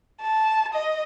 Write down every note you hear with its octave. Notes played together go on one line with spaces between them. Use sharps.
A5
D#5